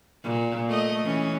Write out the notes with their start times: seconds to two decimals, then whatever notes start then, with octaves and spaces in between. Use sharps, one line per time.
0.23 A#2
0.69 A3 D#5
1.04 E3 C#4